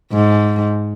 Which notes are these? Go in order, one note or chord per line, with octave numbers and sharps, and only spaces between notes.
G#2